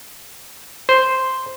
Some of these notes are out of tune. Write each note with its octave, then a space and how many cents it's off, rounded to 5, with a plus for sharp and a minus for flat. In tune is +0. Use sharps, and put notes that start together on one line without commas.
C5 -5